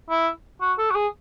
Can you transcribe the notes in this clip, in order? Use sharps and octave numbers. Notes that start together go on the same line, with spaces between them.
E4
F#4
A4
F#4
G#4